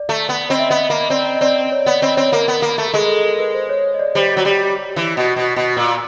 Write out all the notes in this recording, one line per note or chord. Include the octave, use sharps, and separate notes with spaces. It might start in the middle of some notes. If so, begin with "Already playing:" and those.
Already playing: D5
A3
B3
C4 D#5
E5
B3 D#5
A#3
C4 D5
D#5
D#5
C4 D5
D5
C#5
B3 D5
C4 D#5
C4 C#5
A#3 A#4
B3
A#3
A3
A4
G#3 G#4
A4
A#4
B4
C5
C#5
D#5
D5
G3 C5
F#3
G3
E3
B2
B2
B2
A#2